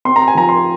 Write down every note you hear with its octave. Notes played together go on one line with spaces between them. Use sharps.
C4 C6
A#5
G#5
F3 A#5
C6